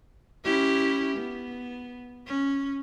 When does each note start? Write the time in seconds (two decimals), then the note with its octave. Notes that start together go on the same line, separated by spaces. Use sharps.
0.45 C#4 E4 G4
1.17 B3
2.27 C#4